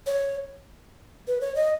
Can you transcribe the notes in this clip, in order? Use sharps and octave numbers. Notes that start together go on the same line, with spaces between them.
C#5
B4
C#5
D#5